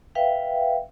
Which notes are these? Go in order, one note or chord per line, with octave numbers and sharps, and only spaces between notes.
B4 E5 F5 G5